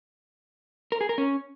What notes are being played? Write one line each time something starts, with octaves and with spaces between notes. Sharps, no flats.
A#4
G#4
A#4
C#4